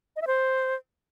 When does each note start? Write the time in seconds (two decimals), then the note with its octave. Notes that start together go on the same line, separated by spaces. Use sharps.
0.16 D#5
0.22 E5
0.27 C5